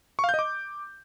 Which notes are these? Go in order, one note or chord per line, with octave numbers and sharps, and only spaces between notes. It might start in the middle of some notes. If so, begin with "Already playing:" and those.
C#6
F5
G6
D#5
D6